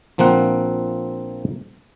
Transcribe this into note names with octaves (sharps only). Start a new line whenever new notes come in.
A#1 F3 A#3 C4 F#5